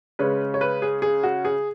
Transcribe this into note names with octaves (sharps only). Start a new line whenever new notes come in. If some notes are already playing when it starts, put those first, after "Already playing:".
C#3 G#3 C#4 B4
C#5
B4
G#4
G#4
F#4
G#4